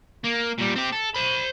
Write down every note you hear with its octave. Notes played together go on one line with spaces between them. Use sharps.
A#3
A#2 G3
C4 G4
A4
C5 B5